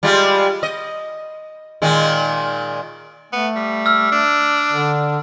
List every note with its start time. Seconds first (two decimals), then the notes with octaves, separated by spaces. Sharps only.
0.03 G3 G#3 F4
0.63 D#5
1.82 A#2 D#3 G#3
3.33 A3 B3
3.56 G3
3.86 E6 F6
4.12 D4
4.73 D3